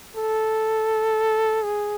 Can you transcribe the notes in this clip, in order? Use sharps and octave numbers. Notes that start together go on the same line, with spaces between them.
A4
G#4